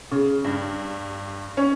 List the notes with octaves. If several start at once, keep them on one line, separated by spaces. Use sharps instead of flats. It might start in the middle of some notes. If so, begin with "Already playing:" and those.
C#3
G2
C#4